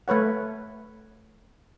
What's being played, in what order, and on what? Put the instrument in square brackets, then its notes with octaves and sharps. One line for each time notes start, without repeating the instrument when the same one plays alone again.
[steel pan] A3 B4 C#5 F#5